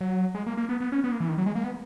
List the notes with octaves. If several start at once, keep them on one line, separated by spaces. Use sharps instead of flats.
F#3
G#3
A#3
A#3
B3
B3
C#4
B3
A#3
E3
D#3
F#3
G#3
A#3
B3